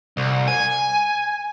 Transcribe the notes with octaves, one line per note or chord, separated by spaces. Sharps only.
C2
G#5